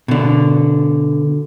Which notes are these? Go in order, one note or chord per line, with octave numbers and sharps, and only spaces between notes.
B2 D3